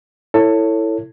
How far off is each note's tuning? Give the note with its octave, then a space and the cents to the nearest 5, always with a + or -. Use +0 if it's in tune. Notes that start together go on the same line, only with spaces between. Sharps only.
E4 +0 A4 +20 C#5 +0